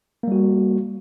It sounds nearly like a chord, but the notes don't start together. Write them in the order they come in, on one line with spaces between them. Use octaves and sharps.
A#3 G3 F#4